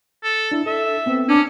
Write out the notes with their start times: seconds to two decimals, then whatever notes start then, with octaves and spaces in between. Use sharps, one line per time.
0.24 A4
0.51 D4 E4
0.66 A4 E5
1.06 B3 C4 B4
1.29 C#4 D4